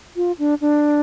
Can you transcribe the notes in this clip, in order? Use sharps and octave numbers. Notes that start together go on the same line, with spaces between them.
F4
D4
D4